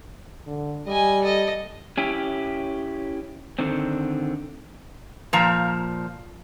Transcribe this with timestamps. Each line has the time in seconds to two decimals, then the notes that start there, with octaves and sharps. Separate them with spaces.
0.47 D3
0.87 G3 D#5 G#5
1.23 A4 D#5
1.97 C#4 E4 G4
3.59 D3 D#3 C4
5.33 A#2 F3 A#5